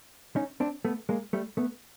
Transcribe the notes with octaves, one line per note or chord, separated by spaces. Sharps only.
C#4 D#4
C4 D4
A3 B3
G#3 A#3
G3 A3
A3 B3